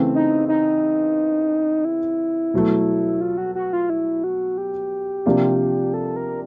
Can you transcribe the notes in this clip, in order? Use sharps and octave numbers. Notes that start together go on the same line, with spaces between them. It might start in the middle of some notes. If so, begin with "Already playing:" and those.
Already playing: C#3 E3 A3 C4
D#4
D#4
E4
B2 F#3 A3
F4
F#4
F#4
F4
E4
F#4
G4
C3 F3 A#3 D4 F4
A4
A#4